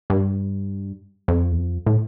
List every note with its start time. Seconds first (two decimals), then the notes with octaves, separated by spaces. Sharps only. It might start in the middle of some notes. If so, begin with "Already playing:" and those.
0.10 G2
1.28 F2
1.52 E2
1.57 F2
1.86 A2